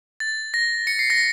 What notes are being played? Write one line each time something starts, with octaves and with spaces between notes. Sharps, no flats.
A6
A#6
C#7
C7
A#6